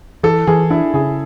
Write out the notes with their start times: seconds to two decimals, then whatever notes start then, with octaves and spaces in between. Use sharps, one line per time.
0.23 E3 A4
0.47 E3 G#4
0.70 D4 E4
0.94 C#3 G#4